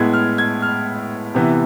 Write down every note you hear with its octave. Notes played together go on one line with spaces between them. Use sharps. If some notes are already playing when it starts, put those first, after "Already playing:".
Already playing: A2 G#3 B3 G#6
F6
G#6
F6
C3 E3 B3